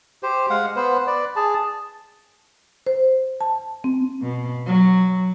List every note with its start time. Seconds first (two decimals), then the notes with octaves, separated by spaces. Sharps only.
0.23 G4 C5
0.50 G#3 F5 F#5
0.76 B3 B4 C5
1.07 B4 D5
1.36 G#4 A5
2.87 C5
3.41 A5
3.84 C4
4.21 B2
4.66 F#3